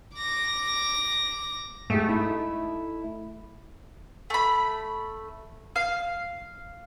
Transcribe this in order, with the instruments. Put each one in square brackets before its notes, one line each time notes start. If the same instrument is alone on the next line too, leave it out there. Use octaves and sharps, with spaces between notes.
[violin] D6 A#6
[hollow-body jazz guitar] G#2 G4 [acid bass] A3
[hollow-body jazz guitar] D#4 E4
[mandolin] A3 B5
F5